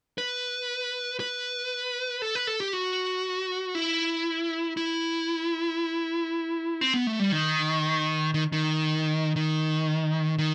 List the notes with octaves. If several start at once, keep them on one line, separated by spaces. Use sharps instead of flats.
B4
B4
A4
B4
A4
G4
F#4
E4
E4
C4
B3
A3
G3
D#3
D#3
D#3
D#3
D#3